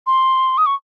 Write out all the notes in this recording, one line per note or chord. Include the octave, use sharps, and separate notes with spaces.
C6
D#6
C#6